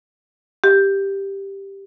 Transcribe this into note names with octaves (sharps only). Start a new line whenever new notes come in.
G4